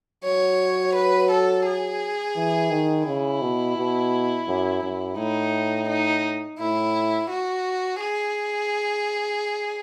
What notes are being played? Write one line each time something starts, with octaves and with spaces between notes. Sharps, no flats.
F#3 C#5
B4
A4
G#4
E3
D#3
C#3 E4
B2
B2
F#2
F#2
A2 D#4
D#4
A2 E4
F#4
G#4